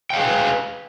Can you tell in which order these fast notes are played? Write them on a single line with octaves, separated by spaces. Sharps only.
G5 F5 G#4 B4